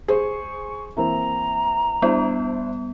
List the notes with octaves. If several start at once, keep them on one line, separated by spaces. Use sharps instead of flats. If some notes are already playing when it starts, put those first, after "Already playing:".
G#4 C5 C#6
E3 A#3 C4 A#5
G3 B3 D4 E4 C5